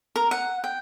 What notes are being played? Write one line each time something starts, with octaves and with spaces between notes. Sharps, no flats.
A#4
F#5
G5